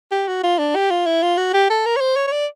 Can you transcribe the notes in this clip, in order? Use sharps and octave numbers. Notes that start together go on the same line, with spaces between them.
G4
F#4
F4
D4
G4
F4
E4
F4
F#4
G4
A4
A#4
C#5
C5
C#5
C#5
D5